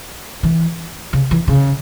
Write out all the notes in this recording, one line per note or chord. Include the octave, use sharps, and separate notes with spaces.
E3
C#3
E3
C#3